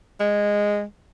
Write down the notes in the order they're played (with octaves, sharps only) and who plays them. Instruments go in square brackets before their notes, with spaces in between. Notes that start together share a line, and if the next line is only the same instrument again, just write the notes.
[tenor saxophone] G#3